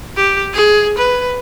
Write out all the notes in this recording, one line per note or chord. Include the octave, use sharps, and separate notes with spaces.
G4
G#4
B4